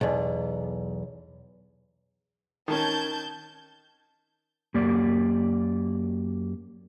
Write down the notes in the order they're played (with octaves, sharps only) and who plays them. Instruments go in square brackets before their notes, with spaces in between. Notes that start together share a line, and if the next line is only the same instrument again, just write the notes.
[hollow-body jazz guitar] B1 E2
[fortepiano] D#3 C#4 [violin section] A5 G6 G#6
[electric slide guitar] F#2 A#3 G4 D5